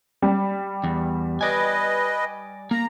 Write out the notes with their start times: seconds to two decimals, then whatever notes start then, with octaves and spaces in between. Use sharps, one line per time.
0.22 G3
0.84 E2
1.41 B4 D5 D#5 G#5
2.71 A#3 A#5